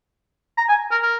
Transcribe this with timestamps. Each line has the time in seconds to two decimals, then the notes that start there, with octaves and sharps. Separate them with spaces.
0.58 A#5
0.69 G#5
0.91 A#4
1.03 A#4